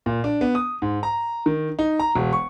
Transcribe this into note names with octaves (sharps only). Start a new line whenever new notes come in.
A#2
D4
B3
D#6
G#2
A#5
D#3
D#4
A#5
E1
C#6